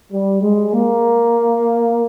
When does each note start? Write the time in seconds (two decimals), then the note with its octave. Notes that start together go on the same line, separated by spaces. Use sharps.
0.12 G3
0.42 G#3
0.73 A#3